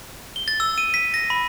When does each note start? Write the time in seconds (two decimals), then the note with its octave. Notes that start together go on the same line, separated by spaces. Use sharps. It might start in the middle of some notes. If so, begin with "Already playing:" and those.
0.36 G7
0.48 A6
0.60 E6
0.78 D#7
0.94 B6
1.14 A#6
1.30 B5